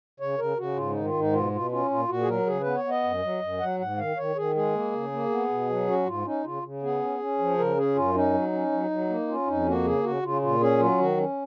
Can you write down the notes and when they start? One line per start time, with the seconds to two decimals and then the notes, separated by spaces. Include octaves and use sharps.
0.20 C#3 C#5
0.38 C#3 A#4
0.58 C#3 F#4
0.76 G#2 F4
0.91 D#3 D#4
1.05 F4
1.14 G#2
1.19 D#4
1.33 B2 F4
1.52 B2 F4
1.71 C#4 F4
1.90 A#2 F4
2.08 A#2 F#4
2.21 G#4
2.28 F#3 A#4
2.46 C#3 G#4
2.61 B4
2.66 B3
2.75 C#5
2.84 B3
2.90 D#5
3.04 F#2
3.22 F#3
3.42 F#2
3.60 F#3 F#5
3.79 G#2 F#5
3.98 D#3 F5
4.17 D#3 C#5
4.36 D#3 G#4
4.55 G#3 G#4
4.73 A#3
4.92 C#3
5.12 A#3
5.30 B3
5.49 B2
5.69 F#3
5.87 C#4 F#4
6.06 G#2 F4
6.25 C#4 D#4
6.44 C#3 F4
6.63 C#3
6.82 B3 G#4
7.01 C#4
7.19 C#4
7.39 F3
7.58 C#3 A#4
7.76 C#4 G#4
7.96 F#2 F4
8.14 C#4 D#4
8.33 F#3
8.53 C#4
8.72 F#3
8.90 F#3
9.09 A#3
9.28 C#4 F4
9.47 F2 D#4
9.66 A#3 F#4
9.84 C#3 G#4
10.04 C#3 F#4
10.22 C#3 F4
10.42 A#2 F4
10.61 C#4 G#4
10.79 F#3 F4
10.98 D#3 F#4
11.17 C#4